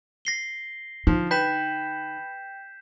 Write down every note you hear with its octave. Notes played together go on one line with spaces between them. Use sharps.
A#6 C7 G7
D3 F3 D#4
B4 G5 G6 B6 E7